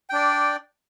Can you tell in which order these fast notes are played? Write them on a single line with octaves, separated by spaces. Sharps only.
G5 D4 D5